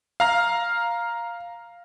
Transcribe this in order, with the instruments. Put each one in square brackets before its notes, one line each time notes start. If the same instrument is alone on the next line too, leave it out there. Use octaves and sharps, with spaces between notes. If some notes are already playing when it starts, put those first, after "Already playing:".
[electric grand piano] F5 A#5 F6